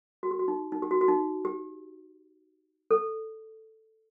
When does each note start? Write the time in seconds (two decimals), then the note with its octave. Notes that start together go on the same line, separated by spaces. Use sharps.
0.23 F#4
0.31 G4
0.39 F#4
0.48 D#4
0.72 D#4
0.82 G4
0.91 F#4
1.01 F#4
1.08 D#4
1.45 G4
2.91 A4